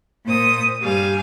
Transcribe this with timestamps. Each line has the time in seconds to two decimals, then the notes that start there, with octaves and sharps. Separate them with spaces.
0.25 A#2 C5 D#6
0.80 G2 G3 F5 G#5